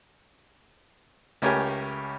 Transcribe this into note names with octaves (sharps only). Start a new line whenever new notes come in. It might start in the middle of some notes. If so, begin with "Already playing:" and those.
C#2 A3 C#4 G4 A#4 G#5